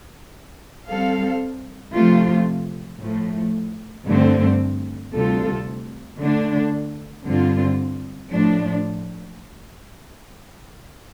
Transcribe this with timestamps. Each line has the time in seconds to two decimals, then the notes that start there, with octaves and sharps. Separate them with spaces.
0.87 G3 C4 A4 F5
1.94 C3 F3 A3 F4
3.00 A2 F3 A3
4.06 G2 D3 A3 C4
5.12 D2 C3 G3 F4 A4
6.18 D3 A3 D4
7.25 G2 D3 G3 C4 F4
8.31 A2 F3 D4